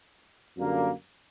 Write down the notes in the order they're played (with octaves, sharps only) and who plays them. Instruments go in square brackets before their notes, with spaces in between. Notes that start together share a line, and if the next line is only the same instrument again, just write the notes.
[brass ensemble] F#2 D3 G3 A#3